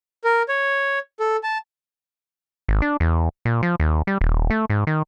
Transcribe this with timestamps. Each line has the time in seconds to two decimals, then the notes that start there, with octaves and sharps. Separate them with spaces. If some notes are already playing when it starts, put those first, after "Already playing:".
0.24 A#4
0.48 C#5
1.20 A4
1.43 A5
2.69 G#1
2.82 D4
3.00 E2
3.45 A#2
3.63 F3
3.80 D#2
4.07 G3
4.21 D#1
4.50 A3
4.70 G#2
4.87 D#3